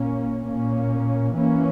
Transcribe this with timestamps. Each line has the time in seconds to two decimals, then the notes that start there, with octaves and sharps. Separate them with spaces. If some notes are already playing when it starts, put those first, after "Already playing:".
Already playing: A#2 A#3 C#4
0.46 A#2 A#3 C#4
1.34 E3 A#3 C#4